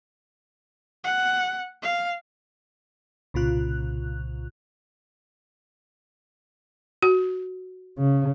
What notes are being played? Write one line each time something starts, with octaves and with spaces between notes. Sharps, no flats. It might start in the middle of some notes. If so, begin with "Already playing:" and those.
F#5
F5
C2 A#2 C#3 F4 F#6
F#4
C#3